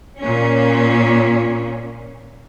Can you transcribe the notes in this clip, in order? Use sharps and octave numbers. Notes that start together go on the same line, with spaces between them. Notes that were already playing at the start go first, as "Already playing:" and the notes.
A#2 C#4